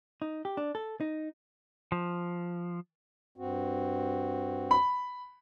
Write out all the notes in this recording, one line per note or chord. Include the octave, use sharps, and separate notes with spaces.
D#4
G4
D4
A4
D#4
F3
G2 C4 F#4
B5